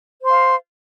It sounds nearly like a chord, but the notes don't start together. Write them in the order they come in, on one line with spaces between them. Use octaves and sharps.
C5 C6 F5